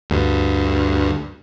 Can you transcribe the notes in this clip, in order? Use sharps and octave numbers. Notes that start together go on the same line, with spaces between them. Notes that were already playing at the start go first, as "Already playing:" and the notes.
D2 G2